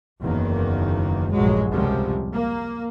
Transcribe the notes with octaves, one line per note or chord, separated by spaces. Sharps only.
F#1 E2 D#3 A#3
F1 A#1 G2 F#3 G#3
C#2 F#2 C3 F3 G3 G#3
A#3